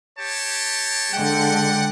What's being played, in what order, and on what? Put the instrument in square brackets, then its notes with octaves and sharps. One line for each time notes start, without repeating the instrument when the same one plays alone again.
[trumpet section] G4 C#5 A5
[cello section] D3 G#3 [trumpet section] D5 F#5 [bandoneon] G5